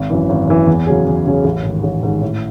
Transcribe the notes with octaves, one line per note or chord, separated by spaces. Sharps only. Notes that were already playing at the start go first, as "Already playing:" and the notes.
Already playing: G#1
F#2 E3
G#1
F#2 E3
E2
C#3 F#3 C#4 G#4
E2
C#3 F#3 C#4 G#4
A1
G#2 D#3
A1
G#2 D#3
A2